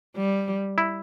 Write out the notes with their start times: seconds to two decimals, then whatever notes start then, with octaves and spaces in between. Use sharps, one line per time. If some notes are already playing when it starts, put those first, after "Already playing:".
0.17 G3
0.78 E4